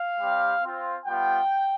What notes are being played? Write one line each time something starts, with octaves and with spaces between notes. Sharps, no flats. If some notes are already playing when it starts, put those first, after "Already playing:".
Already playing: F5
G3 C4 G4
C4 F4
G3 B3 F4 G5